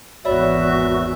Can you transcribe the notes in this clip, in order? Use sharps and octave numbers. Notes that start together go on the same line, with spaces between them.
G#1 E2 F#4 C#5 D5 E5 B5